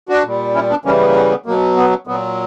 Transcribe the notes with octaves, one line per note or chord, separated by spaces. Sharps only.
D4 F#4
A#2 G3
C#4 E4
B3 D4
C#3 E3 G3 A#3 C#4
B3
A#3
B3
B3
B2 F#3 A#3
B3
A#2 F#3 B3